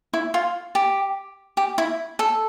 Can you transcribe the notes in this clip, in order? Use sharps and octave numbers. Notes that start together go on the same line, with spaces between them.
E4
F4
G4
G4
E4
A4